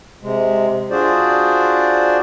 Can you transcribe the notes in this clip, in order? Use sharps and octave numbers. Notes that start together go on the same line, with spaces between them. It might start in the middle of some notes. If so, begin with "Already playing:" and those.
C3 G#3
D4 F4 F#4 G#4 C5 D5